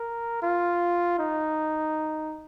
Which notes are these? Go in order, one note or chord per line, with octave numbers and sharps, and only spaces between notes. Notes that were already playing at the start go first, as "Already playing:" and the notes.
Already playing: A#4
F4
D#4